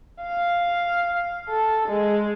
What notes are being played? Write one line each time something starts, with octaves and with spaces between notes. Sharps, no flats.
F5
A4
G#3